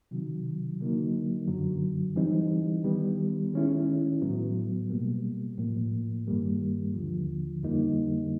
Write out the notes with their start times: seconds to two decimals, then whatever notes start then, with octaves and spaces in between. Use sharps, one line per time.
0.11 C3 D#3 F#3
0.80 D3 F#3 A#3 D#4
1.48 F#2 D3 F#3
2.16 E3 G3 C4 D#4
2.84 D#3 G3 B3
3.54 D#3 G#3 C#4 E4
4.22 A2 F#3 B3
4.90 B2 G3 A#3
5.58 A2 F3 A#3
6.27 G2 D#3 G3 A#3
6.94 D#2 D3 F3
7.63 F2 D3 G3 A#3 D#4